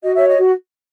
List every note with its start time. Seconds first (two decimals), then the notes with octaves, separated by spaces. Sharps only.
0.02 F#4 D#5
0.15 C#5 E5
0.27 D#5
0.36 F#4